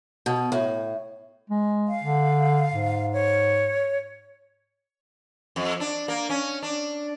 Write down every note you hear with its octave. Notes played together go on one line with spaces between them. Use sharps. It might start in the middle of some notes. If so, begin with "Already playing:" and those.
B2
A2
G#3
F5
D3
G#2
C#5
F2
D4
A#3
C#4
D4